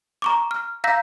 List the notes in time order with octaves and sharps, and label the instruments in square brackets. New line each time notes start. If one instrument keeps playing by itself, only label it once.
[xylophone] A#5 C#6 D6
F6
F5 A#5 E6 G6 A#6 B6